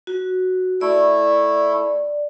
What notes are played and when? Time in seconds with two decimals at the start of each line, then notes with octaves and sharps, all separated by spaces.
0.07 F#4
0.81 A3 E4 A4 D5